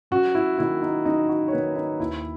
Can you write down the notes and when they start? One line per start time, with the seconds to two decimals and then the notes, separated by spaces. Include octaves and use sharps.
0.11 F#2 F#4
0.35 E4
0.58 D#3 A#3 E4
0.82 D#4
1.05 F#2 D#4
1.29 F#4
1.48 C#5
1.53 D#3 A#3 B4
1.76 D#4
1.99 D#2 E4